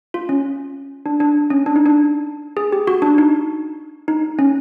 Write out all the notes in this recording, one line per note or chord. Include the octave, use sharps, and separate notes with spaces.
F4
C#4
D4
D4
C#4
D4
D#4
D4
G#4
G4
F#4
D4
D#4
D#4
C#4